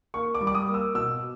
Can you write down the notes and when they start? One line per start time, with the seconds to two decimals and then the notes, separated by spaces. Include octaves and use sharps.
0.14 A#3 C#6
0.35 D6
0.41 G3
0.47 D6
0.55 D#6
0.67 A#3
0.74 E6
0.94 B2 E6